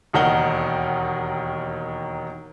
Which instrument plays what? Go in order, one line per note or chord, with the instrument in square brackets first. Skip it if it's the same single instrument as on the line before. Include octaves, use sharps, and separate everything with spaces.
[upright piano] E1 D#2 D#3 A#4 F#5 G7